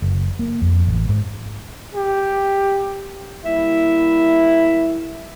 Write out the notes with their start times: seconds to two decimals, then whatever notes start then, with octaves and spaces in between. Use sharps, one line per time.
0.02 F#1
0.39 A#3
0.62 F2
0.87 A1
1.09 G#2
1.95 G4
3.45 G3 A#3 E4 E5